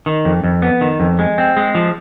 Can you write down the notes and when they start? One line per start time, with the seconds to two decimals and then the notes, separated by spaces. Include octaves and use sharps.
0.06 D#3
0.25 F2
0.44 F2
0.62 B3
0.81 D#3
1.00 F2
1.19 G#3
1.38 C4
1.57 G#3
1.75 F3